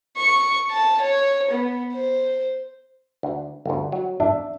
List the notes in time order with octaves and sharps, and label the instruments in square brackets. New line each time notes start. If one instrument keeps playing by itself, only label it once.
[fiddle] C#6
A5
C#5
B3
C5
[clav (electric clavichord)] D2
G1 D2
F#3
[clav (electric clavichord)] D4 [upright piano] E5